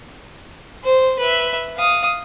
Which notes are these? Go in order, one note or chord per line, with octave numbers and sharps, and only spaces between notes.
C5
B4 E5
F5 D#6